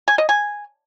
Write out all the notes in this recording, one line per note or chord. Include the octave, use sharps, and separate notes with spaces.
G#5
D#5
G#5